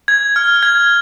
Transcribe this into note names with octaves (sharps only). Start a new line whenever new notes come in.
G#6
F6
G#6